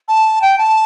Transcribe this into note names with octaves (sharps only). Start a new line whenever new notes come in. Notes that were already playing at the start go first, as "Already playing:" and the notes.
A5
G5
A5